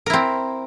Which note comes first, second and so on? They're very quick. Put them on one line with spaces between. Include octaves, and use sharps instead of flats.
A#4 E4 C4